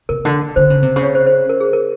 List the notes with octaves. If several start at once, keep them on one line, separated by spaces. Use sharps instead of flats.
C3 A#4
D3
D3 C5
C#3
C3
C#3
C#5
C5
C5
A#4
G#4
A#4